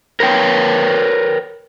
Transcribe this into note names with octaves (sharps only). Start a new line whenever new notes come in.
A#4 B4 C#5 G5